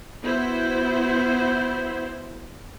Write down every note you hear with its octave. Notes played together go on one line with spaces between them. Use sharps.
B3 E4 F#4 C5